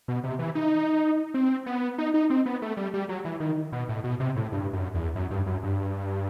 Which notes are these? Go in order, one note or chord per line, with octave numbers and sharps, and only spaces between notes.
B2
C3
E3
D#4
C4
B3
D#4
D#4
C4
B3
A3
G3
G3
F#3
E3
D#3
B2
A2
B2
C3
A2
G2
F#2
E2
F#2
G2
F#2
G2